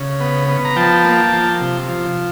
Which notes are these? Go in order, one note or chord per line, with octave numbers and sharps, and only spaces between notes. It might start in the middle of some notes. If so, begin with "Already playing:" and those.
Already playing: C#3
B3
B3
A#5
F3 G5 A5
A#3
F3
C3
F3